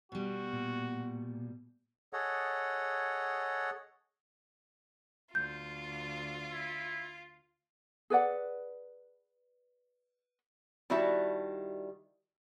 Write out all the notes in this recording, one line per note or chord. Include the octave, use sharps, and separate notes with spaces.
B2 G3 F#4
A#2
G#4 A4 C#5 D#5 F#5
D2 F4 G6
E4
G#4 B4 D5 F#5
D#3 G3 E4 F#4 E5 A5